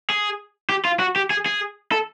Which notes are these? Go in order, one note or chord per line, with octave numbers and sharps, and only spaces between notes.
G#4
G4
F4
F#4
G4
G#4
G#4
A4